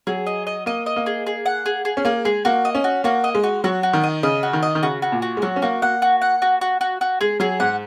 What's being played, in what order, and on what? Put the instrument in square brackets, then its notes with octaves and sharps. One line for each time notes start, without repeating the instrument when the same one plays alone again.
[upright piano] F#3 [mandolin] G#4
[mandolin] D#5
D#5
[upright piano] A#3 [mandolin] D#5
[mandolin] D#5
[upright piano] A#3
[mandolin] G#4
G#4
F#5
G#4
G#4
[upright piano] C#4
[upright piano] A#3 [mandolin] G#4
[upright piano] G#3 [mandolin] G#4
[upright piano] A#3 [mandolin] F#4
[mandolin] D#5
[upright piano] C#4
[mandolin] F#4
[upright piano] A#3 [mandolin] F#4
[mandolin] D#5
[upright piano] G#3
[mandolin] F#4
[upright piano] F#3 [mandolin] F#4
[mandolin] F#4
[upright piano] D#3
[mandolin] D#5
[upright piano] C#3 [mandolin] D#5
[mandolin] F#4
[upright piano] D#3
[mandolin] D#5
[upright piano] D#3
[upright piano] C#3 [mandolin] F#4
[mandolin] F#4
[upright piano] A#2
[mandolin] F#4
[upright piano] G#3
[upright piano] F#3 [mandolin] F#4
[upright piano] C#4
[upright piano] A#3 [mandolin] F#4
[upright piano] A#3 [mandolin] F#5
[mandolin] F#4
F#5
F#4
F#4
F#4
F#4
[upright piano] G#3 [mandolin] G#4
[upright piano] F#3 [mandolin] G#4
[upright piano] G#2 [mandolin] F#5